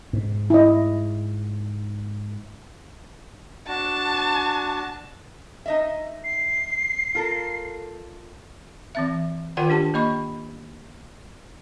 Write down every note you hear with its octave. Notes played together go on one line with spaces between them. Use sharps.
G#2
E4 D#5
D4 F#4 A5
D#4 D#5 E5
C7
F4 A4 A#4
E3 C4 E5
D#3 F4 A#4 D5 F#5 G5
D4 G4 A5
A#3 D#5 B5 C#6